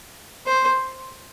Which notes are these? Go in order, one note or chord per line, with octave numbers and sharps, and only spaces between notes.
C5